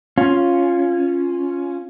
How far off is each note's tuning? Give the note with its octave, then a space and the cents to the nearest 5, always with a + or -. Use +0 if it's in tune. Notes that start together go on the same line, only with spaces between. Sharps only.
C#4 +0 F4 +0